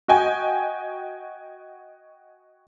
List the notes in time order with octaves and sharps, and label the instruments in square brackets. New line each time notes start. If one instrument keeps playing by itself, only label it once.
[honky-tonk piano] F#4 D#5 G5 G#5